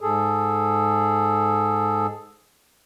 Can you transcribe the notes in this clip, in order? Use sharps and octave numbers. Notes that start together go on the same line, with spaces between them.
G#2 G#4 A4